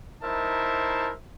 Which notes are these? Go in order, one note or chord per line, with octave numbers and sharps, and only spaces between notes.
D#4 E4 A#4 C5 E5 A5